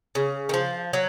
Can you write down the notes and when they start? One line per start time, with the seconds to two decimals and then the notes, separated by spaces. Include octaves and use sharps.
0.15 C#3
0.49 D#3
0.54 F3
0.93 F#3